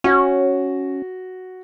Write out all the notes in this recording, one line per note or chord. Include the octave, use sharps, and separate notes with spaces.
C#4 F#4